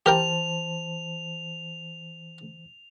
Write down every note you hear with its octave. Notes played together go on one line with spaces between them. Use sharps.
E3 G4 A#4 C5 G5 A5 F7